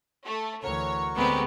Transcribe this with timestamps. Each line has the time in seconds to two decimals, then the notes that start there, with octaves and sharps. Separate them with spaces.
0.25 A3
0.63 D2 E3 F#4 A#4 C#5 C#6
1.16 D2 D3 G#3 B3 C4 G4